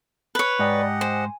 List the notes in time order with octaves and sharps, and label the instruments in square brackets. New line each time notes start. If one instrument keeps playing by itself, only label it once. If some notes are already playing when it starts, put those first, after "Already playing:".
[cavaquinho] B4 C#5
[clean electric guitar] G#2 [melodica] G4 D#5 F#5 [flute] D5
[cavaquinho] C5 [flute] G#5